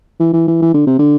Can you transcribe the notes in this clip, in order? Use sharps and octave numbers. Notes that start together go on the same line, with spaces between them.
E3
E3
E3
E3
D3
C3
D3